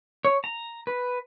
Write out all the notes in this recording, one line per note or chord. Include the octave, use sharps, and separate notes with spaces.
C#5
A#5
B4